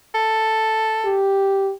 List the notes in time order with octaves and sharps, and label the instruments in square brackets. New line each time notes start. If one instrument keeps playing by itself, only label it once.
[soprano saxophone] A4
[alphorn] G4